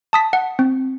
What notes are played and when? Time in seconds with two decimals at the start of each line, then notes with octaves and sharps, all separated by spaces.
0.13 A5 D#6 B6
0.33 F#5
0.59 C4